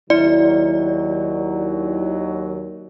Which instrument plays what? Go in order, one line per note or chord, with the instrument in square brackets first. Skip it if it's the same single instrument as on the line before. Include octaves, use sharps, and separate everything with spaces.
[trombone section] D#2 D#3 F#3 [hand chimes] E4 [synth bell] D5